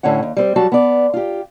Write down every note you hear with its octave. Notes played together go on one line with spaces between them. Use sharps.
A2 D3 C#4 C#5 F#5
D#2
G3 C4 C5
F#3 G3 F#4 A5
B3 D5
F4 G4